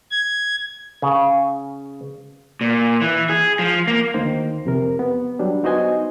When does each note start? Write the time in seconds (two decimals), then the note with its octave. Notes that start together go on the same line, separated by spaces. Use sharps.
0.11 G#6
1.02 C#3
2.61 A#2
3.01 E3
3.30 G#4
3.59 F3
3.87 A#3
4.14 D2 D#3 A#3 C5
4.65 F2 C3 A#4
4.99 B3
5.39 F#3 G3 D4
5.63 B3 D#4 F#4 C5 D#5 G#5